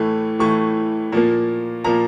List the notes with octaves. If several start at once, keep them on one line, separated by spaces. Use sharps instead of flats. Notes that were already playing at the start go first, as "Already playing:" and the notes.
Already playing: A2 E3 A3
A2 E3 A3 C#6
A#2 F3 A#3
A#2 F3 A#3 A#5